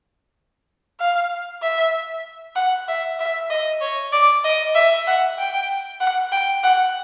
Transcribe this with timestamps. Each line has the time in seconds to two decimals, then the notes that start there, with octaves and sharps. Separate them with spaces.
1.00 F5
1.62 E5
2.56 F#5
2.88 E5
3.19 E5
3.50 D#5
3.81 C#5
4.12 D5
4.44 D#5
4.75 E5
5.07 F#5
5.39 G5
6.01 F#5
6.32 G5
6.64 F#5